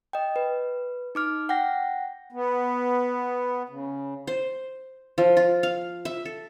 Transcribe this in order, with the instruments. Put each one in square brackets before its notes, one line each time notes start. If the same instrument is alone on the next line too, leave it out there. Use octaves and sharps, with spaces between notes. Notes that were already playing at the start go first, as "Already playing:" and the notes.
[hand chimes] D#5 G5
B4
D#4 D6 F6
F#5 G5 A#6
[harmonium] B3
C#3
[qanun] C5
F3
F4
F5
E5
A4